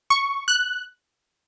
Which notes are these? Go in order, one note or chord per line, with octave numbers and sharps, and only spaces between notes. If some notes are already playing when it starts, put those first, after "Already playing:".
C#6
F#6